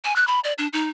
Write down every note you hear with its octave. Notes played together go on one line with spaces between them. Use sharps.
G#5
F#6
B5
D5
D4
D#4